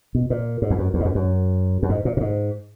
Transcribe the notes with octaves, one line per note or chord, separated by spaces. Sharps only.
B2
A#2
G#2
E2
F#2
E2
G#2
F#2
F#2
F#2
G#2
A#2
A#2
G#2